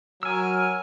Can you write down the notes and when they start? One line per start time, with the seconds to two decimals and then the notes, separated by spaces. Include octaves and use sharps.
0.23 F#3 A#4 G#5 E6 F6